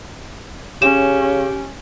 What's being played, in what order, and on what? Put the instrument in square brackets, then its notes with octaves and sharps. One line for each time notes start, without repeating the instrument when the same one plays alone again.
[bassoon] C#3 [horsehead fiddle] C#4 [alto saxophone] G4 [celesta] E7